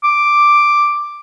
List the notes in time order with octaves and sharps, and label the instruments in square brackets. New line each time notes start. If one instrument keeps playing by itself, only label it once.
[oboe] D6